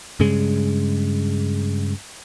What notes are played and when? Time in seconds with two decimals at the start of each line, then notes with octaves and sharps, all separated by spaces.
0.20 G2 C#3 G#3